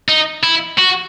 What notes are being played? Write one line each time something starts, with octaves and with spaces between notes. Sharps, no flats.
D#4
E4
F#4